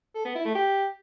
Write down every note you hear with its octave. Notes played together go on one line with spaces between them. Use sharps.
A4
B3
E4
A3
G4